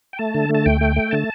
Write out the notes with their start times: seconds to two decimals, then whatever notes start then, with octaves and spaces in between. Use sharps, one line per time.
0.13 G5
0.19 A3 A5
0.34 D3
0.49 A3
0.55 A5
0.66 D2 G5
0.81 A3
0.96 A3
1.11 D3 A5